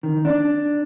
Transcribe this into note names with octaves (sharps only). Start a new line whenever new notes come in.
D#3
D4